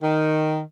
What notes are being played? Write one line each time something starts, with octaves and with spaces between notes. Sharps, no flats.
D#3